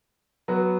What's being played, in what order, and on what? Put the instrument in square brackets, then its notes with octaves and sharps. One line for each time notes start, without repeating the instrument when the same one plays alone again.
[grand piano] F#3 B3 F#4